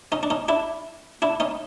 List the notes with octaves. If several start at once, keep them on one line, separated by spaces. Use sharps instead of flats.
C#4 D#4
D4
C#4 D#4
D4 E4
D4 E4
C#4 D#4